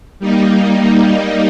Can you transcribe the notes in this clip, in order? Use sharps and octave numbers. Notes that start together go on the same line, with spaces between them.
G3 A#3 D#4